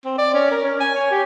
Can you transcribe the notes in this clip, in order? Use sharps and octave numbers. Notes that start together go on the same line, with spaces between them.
C4
D5
C#4
A#4
C#4
G#5
C#5
G4